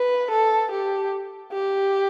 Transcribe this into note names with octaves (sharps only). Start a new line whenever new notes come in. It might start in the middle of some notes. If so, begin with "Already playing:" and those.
Already playing: B4
A4
G4
G4